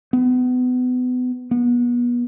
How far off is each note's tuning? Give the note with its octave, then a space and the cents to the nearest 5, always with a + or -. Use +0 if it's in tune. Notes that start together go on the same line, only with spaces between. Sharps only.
B3 +25
B3 -35